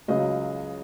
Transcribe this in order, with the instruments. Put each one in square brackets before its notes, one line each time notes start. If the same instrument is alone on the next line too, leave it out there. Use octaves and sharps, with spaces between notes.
[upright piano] C#2 C#3 F#3 D#5